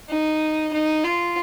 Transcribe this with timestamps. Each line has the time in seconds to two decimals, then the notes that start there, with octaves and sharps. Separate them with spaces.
0.10 D#4
0.73 D#4
1.04 F4